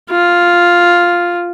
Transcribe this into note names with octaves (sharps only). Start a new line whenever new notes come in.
F4